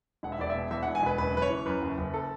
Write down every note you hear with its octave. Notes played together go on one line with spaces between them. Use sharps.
E1 F#5
E5
E1 D5
E5
B2
E2 E5
E1 F#5
G#5
E1 B4
F#1 B4
F#1 B4
C#5
E3
F#2 B4
F#1
F#1
A4